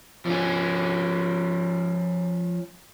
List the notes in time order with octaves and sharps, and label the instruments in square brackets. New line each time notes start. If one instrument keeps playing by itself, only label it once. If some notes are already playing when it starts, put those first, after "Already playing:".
[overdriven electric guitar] F3 C#4